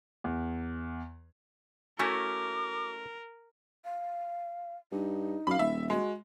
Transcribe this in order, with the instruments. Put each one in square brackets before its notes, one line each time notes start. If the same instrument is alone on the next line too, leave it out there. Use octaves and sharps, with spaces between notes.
[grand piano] E2
[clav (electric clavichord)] A3 C#4 E4 [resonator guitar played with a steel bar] F#4 G#5 [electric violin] A#4 [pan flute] D6
[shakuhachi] F5
[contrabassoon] G2 [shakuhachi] D#4
[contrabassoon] F#2 [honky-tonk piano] F5 B5
[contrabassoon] D#1 [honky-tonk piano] E5
[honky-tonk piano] G#3 [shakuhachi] F#4